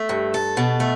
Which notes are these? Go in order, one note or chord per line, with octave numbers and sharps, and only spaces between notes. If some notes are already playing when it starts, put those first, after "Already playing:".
Already playing: A3
G2
A4
B2
A3